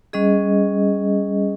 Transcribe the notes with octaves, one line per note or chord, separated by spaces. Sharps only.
G3 C#4 G#4 D#5